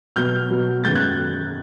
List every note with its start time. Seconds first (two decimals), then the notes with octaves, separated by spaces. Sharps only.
0.16 B2 F#3 B3 F6 G6
0.50 B2 F#3 B3
0.84 F#2 D#3 G#3 B3 G6 A6
0.95 F#6 G#6